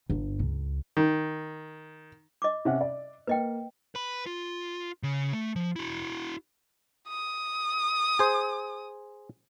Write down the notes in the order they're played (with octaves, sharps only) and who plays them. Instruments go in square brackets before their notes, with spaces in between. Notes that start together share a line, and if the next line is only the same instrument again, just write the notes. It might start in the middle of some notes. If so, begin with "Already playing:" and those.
[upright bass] G1
C#2
[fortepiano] D#3
[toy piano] D#5 D6
[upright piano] C3 C#4 F#5
D5
[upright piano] A#3 [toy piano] B4 D#5 G5
[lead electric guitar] B4 B5
F4
C#3
A3
F3
E4 F#4
[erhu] D#6
[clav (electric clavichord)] G#4 C5